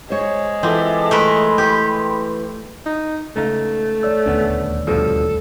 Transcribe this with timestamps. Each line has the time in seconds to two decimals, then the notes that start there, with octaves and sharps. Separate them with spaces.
0.10 G#3 C5 C#5
0.63 E3 C4 F4 A4 E5 D6
1.11 A3 A#4 B4 B5 C6
1.58 E3 G4 B4
2.86 D#4
3.36 C#2 A3 D#4 F5
4.03 C#5 D5 E6
4.26 D#1 D2 B3 C#4 D4
4.87 G2 B2 F3 A4